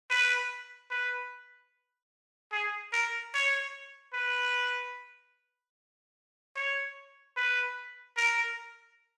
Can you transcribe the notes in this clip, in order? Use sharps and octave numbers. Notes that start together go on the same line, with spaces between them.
B4
B4
G#4
A#4
C#5
B4
C#5
B4
A#4